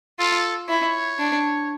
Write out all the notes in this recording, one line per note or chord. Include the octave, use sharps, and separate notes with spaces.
F4 A4
E4 C#5
D4